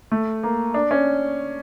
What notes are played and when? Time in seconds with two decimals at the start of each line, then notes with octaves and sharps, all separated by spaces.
0.11 A3
0.43 A#3
0.74 D4
0.91 C#4